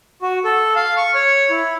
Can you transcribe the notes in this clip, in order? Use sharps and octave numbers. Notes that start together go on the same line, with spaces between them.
F#4
A4
F5
C#6
C#5
E4